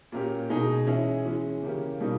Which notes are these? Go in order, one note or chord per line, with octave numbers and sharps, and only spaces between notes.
A#2 A#3 C#4 G4
B2 G#3 D#4 G#4
E3 G#3 C#4 E4 G#4
E3 G#3 C#4
C#3 E3 A#3 C#4 G4
B2 G3 A#3 D#4